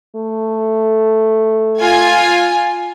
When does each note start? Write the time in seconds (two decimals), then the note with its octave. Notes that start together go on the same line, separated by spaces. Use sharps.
0.15 A3
1.81 F4 G#5